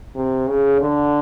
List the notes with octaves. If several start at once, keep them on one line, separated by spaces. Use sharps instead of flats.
C3
C#3
D3